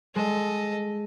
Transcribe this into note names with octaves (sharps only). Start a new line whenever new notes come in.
G#3 A4 D#5